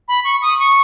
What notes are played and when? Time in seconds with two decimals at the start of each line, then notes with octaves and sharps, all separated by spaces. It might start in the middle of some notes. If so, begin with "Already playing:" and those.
0.08 B5
0.24 C#6
0.42 D#6
0.59 C#6